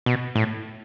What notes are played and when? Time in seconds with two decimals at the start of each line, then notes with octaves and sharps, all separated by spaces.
0.06 B2
0.36 A2